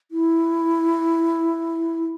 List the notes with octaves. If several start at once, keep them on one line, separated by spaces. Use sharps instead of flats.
E4